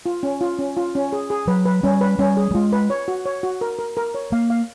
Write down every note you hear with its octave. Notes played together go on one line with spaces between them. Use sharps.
F4
C#4
F4
C#4
F4
C#4
G#4
G#4
F#3 B4
B4
G3 C#4
B4
G3 C#4
G#4
G3
G#3 F4
B4
C#5
F#4
C#5
F#4
A#4
A#4
A#4
C#5
A#3 F5
F5